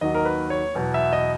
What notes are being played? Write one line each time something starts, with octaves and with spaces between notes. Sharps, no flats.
D#2 D#3 F#3 D#5
A#4
B4
C#5
E2 B2 F#3
E5
D#5